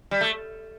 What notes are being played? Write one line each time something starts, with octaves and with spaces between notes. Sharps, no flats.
G3
A3